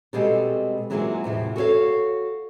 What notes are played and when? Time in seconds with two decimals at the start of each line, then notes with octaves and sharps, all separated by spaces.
0.13 B2 G3 G#3 C4 F#4 A4
0.90 E3 F#3 G#3 A#3 C4 F4
1.24 E2 A2 C3 F3
1.56 F#4 A4 A#4 C#5 F5